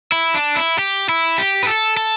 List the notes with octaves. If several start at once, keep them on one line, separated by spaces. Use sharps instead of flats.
E4
D4
E4
G4
E4
G4
B4
A4
A4